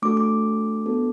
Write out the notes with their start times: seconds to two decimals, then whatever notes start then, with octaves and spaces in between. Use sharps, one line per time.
0.02 A3 D4 F#4 A4 D6
0.17 D6
0.86 B3 D4 F#4 A4